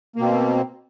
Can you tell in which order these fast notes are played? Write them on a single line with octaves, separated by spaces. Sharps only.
A#3 B2 C4